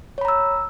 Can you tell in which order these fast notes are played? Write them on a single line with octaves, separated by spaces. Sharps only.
C#5 B5 A#5 E6